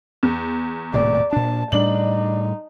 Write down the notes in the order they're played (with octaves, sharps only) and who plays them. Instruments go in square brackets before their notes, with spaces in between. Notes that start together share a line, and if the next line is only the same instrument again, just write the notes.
[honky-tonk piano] E2
[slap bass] D#1 A2 C3 [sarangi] D5
[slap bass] A#2 D4 [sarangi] A5
[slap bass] A2 G3 [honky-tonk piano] D4 F#7 [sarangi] D#4